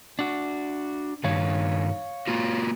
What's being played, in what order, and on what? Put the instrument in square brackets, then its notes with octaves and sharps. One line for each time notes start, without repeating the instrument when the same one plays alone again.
[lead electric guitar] D4 F#4
[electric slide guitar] G2 D#3 [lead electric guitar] C#5 F5
[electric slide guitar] A#3 F4 F#4